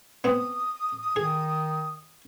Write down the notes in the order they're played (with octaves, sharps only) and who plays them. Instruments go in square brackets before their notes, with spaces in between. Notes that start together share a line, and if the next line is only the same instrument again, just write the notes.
[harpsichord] B3 C4 [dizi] D#6
[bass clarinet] D#3 [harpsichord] G#4